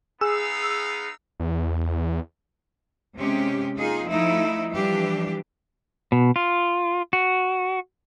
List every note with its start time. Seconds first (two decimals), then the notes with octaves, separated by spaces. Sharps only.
0.21 B3 D#4 G#4 F5 E6
1.40 E2
3.17 C3 G#3 C#4 G4
3.76 A#3 D#4 F4 G#4
4.07 F3 A3 D#4 E4
4.73 E3 F3 G3 D4 G4
6.12 B2
6.36 F4
7.13 F#4